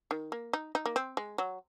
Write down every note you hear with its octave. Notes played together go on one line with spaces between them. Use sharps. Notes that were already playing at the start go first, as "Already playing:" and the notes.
D#3
A#3
D#4
D#4
A#3
C4
G#3
F#3